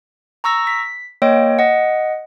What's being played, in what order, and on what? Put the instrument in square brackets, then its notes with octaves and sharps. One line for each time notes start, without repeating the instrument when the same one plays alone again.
[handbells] A#5 C#6 E6 A#6
B6
A#3 C#5 D#5 G5
D#5 F#5